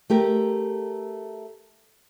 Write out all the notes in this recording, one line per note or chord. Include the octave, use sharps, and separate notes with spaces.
A3 G4 A#4